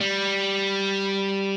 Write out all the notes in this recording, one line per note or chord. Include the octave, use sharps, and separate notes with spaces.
G3